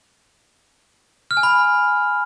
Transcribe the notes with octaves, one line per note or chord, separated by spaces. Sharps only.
F6
G#5
B5